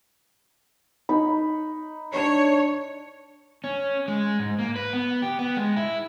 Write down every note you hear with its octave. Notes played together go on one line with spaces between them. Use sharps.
D#4 B5
D4 C#5
C#4
G#3
G#2
A#3
B4
B3
G4
B3
G#3
E4